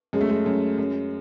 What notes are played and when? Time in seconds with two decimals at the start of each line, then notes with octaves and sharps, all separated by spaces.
0.13 F#2 G#3
0.21 A3
0.29 G#3
0.46 F#2
0.78 F#2